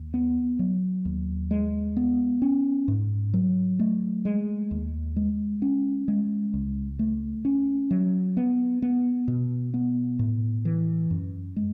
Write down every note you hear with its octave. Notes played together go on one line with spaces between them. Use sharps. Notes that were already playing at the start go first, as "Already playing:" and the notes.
Already playing: D#2
B3
F#3
D#2
G#3
B3
C#4
G#2
F#3
A3
G#3
D#2
G#3
C#4
G#3
C#2
A3
C#4
F#3
B3
B3
B2
B3
A2
E3
F#2
G#3